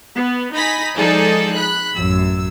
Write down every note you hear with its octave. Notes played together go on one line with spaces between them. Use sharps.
B3
D#4 G#5 B5 A#6 B6
F3 G#3 D#4 G#4 A4 D5
B5 F#6
A1 F#2 E6